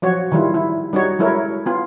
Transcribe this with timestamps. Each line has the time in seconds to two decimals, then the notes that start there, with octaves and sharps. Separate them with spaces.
0.02 F3 F#3 F#4 C#5
0.32 D#3 E3 G3 E4 F4
0.54 E4
0.93 G3 D#4 F#4 C#5
1.19 F#3 G#3 E4 A4 A#4 C#5
1.66 B3 F4